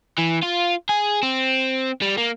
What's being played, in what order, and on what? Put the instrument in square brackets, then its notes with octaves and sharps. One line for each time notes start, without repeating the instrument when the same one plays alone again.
[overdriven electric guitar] E3
F4
G#4
C4
G3
A#3